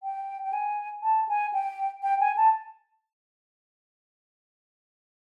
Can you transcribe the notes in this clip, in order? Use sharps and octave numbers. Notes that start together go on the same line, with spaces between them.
G5
G5
G#5
A5
G#5
G5
G5
G#5
A5